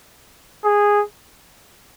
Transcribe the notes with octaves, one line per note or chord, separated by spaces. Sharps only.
G#4